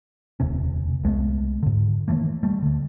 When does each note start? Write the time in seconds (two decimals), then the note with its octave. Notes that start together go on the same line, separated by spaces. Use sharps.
0.40 E1 D2 C3 C#4
1.04 C2 G#3 A3 B3
1.63 G#2 D3
2.08 D#3 E3 A3 A#3
2.43 G3 A3
2.62 D2 D3